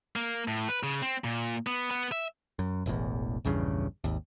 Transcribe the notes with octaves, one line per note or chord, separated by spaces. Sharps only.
A#3
A2
B4
C#3
C4
A#2
B3
B3
E5
F#2
E1 A1 E2
A#1 E2 G2 C#3
G#1 D#2